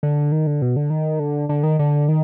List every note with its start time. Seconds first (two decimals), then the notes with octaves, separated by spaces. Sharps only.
0.03 D3
0.32 D#3
0.47 D3
0.62 B2
0.76 D3
0.90 D#3
1.20 D3
1.49 D3
1.63 D#3
1.79 D3
2.09 D#3